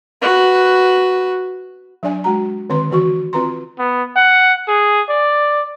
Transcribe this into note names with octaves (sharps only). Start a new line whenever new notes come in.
F#4 B4
F#3 D4 D5 G#5
G#3 F#4 A#5
D3 D#3 C4 B4 C6
D3 E3 F#4 C#6
C4 F4 B4 A#5 C6
B3
F#5
G#4
D5